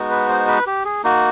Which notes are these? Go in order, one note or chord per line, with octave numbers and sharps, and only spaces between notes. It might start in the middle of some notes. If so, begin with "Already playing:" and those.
Already playing: G#3 B3 D#4 F#4
B4
C5
B4
G4
G#4
A#3 D#4 F#4